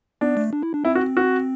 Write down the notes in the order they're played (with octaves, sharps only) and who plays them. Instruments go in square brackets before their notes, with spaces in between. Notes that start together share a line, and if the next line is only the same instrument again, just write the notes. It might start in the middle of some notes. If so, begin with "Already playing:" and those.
[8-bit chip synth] B3 [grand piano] D4
[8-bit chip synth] A3
D4
E4
D4
[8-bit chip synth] C4 [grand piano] E4
[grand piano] F#4
F#4